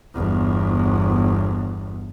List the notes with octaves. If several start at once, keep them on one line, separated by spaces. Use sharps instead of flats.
G1 E2